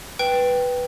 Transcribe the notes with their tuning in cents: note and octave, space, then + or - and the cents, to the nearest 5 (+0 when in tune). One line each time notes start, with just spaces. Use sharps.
B4 +0 G5 +0